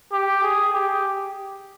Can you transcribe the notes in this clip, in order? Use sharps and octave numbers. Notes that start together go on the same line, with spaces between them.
G4
G#4
G4